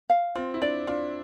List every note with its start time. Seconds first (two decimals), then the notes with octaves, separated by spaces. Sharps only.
0.10 F5
0.35 C4 F4
0.54 E4
0.61 D4 D5
0.87 D4 F4